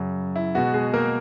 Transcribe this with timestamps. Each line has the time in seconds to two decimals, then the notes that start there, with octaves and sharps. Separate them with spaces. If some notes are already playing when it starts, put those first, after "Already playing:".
Already playing: F#2 C#3 F#3
0.36 E4
0.55 B2 G#3 B3 F#4
0.73 G#3 G#4
0.93 A#3 A#4